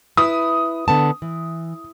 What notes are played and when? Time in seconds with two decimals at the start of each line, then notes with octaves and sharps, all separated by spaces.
0.17 E4 B4 D#6
0.88 D3 B3 A5
1.22 E3